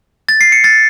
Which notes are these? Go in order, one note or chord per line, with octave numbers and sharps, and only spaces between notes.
A6
C7
C#7
A6